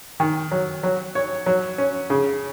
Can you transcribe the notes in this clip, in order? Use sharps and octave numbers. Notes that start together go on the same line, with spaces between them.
D#3
F#3
F#3
C#5
F#3
C#4
C#3